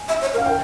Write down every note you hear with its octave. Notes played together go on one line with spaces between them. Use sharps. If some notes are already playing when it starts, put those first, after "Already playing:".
Already playing: G#5
E5
C#5
A#4
F5
G5